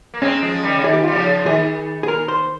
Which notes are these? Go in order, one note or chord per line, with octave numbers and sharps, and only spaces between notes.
A#3
G#3 C4 C#4
F3 G#3
D#3 G3
C#3
D#3 G#4
G4
F4
G3
C#3 F3 G4
D#3 G#4
G#4
A#4
C5